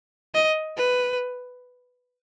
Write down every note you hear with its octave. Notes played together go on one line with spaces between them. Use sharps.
D#5
B4